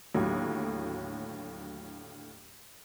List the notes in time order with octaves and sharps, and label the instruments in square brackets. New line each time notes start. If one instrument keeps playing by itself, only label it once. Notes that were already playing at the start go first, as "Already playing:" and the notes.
[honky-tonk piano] D#2 A2 D3 F#3